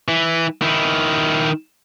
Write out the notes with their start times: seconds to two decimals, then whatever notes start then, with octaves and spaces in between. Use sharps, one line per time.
0.08 E3
0.62 D#3 E4